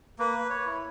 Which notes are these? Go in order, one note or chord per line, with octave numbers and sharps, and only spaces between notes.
A#3 B4
C#5
E4